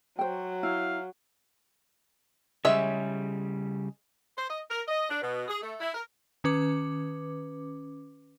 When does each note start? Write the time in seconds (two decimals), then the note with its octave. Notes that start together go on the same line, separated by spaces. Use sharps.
0.19 F#3 C5 G5
0.63 E4 F5
2.65 C#3 G3 G#3 C#5 E5
4.37 C5
4.49 D#5
4.69 A#4
4.88 D#5
5.09 D4
5.22 B2
5.48 G#4
5.62 A3
5.80 E4
5.94 A#4
6.44 D#3 C#4 B4 D6